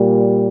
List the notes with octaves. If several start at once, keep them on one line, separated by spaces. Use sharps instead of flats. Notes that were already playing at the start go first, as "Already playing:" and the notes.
Already playing: A#2 G3